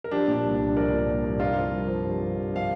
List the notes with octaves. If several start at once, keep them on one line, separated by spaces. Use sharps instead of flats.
A#4
F3 D4 G4
A#2
D4
C2
C2 D4
F3 A#4 D5
A#2
C2
C2
G2 F4 A#4
F3
G2
F3
G2
F3
G2
F3 F5